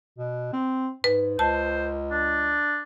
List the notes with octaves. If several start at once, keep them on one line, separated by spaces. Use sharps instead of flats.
B2
C4
G#2 B4
C#2 C5 A5
D4